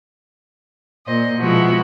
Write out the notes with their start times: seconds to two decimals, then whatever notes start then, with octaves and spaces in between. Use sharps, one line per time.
1.06 A#2 C5 D#5
1.39 B2 F3 G#3 E4 F#4